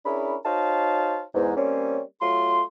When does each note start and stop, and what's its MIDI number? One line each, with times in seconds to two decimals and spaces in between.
0.04 0.35 61
0.04 0.35 62
0.04 0.35 64
0.04 0.35 68
0.04 0.35 70
0.04 0.35 83
0.45 1.22 63
0.45 1.22 66
0.45 1.22 72
0.45 1.22 73
0.45 1.22 77
0.45 1.22 81
1.34 1.54 40
1.34 1.54 44
1.56 2.00 55
1.56 2.00 58
1.56 2.00 60
1.56 2.00 61
2.20 2.61 54
2.20 2.61 57
2.20 2.61 65
2.20 2.61 84